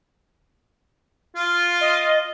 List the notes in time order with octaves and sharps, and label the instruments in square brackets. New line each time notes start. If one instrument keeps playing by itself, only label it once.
[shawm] F4
[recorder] D#5